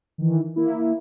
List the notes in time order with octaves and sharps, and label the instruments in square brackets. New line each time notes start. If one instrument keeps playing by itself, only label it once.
[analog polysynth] D#3 E3
A#3 E4